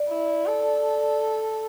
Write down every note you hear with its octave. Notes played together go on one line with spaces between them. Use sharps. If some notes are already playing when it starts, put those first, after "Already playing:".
Already playing: D5
E4
A4 D5